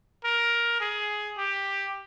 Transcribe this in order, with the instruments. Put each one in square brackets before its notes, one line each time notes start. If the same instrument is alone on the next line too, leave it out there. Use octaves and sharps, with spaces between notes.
[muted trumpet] A#4
G#4
G4